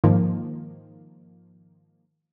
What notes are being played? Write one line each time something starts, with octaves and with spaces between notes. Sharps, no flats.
G#2 D#3 F3 A#3